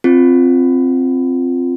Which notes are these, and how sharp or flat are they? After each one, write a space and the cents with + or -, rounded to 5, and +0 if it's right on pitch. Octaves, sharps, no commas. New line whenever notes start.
C4 +0 F4 +0